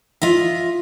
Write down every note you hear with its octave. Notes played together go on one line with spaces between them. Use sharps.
F4 D#5 E5